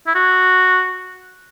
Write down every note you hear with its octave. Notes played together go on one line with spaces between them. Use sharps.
E4
F#4